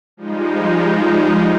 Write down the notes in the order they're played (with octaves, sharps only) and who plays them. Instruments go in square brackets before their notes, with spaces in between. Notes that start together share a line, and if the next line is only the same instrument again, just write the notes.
[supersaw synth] F3 G3 G#3 D#4